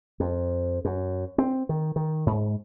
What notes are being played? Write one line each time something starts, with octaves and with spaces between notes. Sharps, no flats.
F2
F#2
C4
D#3
D#3
G#2